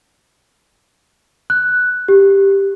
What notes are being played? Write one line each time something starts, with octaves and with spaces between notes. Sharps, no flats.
F#6
G4